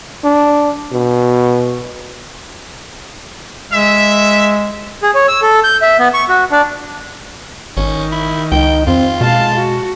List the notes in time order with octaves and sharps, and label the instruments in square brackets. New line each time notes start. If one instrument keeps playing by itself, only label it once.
[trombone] D4
B2
[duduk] G#3 [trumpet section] E5
[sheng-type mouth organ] G#4
C#5
E6
A4
G6
E5
B3
C#6
F#4
D4
[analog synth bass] G#1 [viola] D#3 [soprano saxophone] C#4
[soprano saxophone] E4
[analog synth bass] C#2 [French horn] D#4 [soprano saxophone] G5
[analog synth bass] F2 [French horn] C4 [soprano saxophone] F4
[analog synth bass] B2 [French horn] G#3 [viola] F5 A5
[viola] F#4